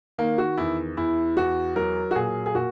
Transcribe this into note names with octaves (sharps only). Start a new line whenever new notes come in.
D#3 A#3
F#4
E2 E4
E2 E4
E2 F#4
F#3 A#4
F#4
A#2 G#4
G#4
A#2 F#4